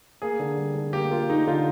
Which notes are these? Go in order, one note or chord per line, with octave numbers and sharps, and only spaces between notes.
A#3 G#4
D3
G3
D3
A#3 G4
A#3 F4
A#3 D#4
D3 F4